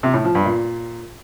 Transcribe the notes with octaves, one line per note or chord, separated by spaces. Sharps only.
C3
A2
F3
G2
A#2